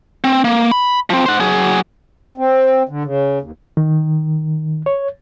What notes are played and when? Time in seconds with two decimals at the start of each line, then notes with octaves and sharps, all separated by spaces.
0.24 C4
0.44 A#3
0.72 B5
1.10 F3 C4
1.26 C5 F#5
1.40 F#3 G#4
2.38 C4
2.89 D3
3.05 C#3
3.42 D#2
3.77 D#3
4.86 C#5